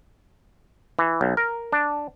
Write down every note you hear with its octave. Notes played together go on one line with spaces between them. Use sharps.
E3
B1
A#4
D4